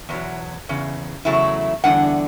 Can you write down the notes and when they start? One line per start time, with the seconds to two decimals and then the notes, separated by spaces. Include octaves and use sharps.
0.09 E2 B2 F#3
0.69 E2 C#3
1.25 E2 C#3 F#3 A3 E4
1.84 E2 D3 G3 D4 F#5